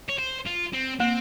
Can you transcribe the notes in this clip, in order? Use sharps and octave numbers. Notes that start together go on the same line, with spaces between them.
C#5
C5
F4
C4
A#3 C4